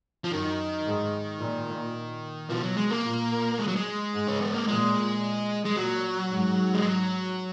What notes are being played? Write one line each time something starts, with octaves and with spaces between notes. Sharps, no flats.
F3
F#2 D#3
G#2
A#2
B2 F3
F#3
G#3
A#3
A#2
G#3
F#3
G#3
G#2
C#4
B3
A#3
A#2 G#3
G#3
A#2 F#3
G#2
G#3
F#3